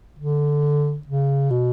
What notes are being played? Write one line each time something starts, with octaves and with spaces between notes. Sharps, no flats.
D3
C#3
B2